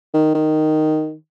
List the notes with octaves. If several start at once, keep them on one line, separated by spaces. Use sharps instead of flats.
D#3
D#3